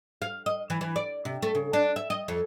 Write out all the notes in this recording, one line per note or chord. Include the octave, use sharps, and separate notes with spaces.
F5
D#5
E3
E3
D5
C3
A3
C#3
D4
E5
D#5
F2